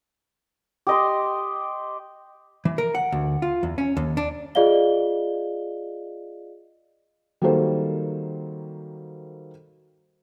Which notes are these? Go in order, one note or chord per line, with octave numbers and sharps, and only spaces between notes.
G4 D#5 C6
E3
A#4
F#5
D2
F4
E2
C#4
D#2
D4
F4 G#4 D5 D#5 F5 G7
D#3 F#3 G3 A#3 A4 C5